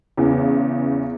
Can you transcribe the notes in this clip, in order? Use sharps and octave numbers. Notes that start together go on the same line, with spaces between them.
E2 C#3 E3